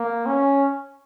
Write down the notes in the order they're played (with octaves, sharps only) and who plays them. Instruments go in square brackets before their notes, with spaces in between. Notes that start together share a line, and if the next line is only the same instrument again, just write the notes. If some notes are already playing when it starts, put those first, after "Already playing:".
Already playing: [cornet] A#3
C#4